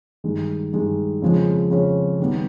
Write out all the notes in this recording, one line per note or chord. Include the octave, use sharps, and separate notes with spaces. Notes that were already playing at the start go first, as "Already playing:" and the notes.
G2 D#3 G#3
G2 D#3 G#3
F2 C#3 F3 G#3 C#4
F2 C#3 F3 G#3 C#4
D#3 G3 B3